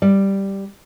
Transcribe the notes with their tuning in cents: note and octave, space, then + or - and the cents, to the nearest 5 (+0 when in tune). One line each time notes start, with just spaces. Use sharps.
G3 +0 D5 +0